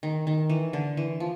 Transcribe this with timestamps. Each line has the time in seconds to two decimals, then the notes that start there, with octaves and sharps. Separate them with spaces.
0.03 D#3
0.27 D#3
0.50 E3
0.73 D3
0.97 E3
1.20 F3